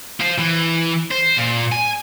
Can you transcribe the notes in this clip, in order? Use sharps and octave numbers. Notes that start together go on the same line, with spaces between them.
F4 C5
E3
C5
A#2
G#5